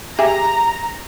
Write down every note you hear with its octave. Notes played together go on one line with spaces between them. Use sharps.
G4 G#4 E5 A#5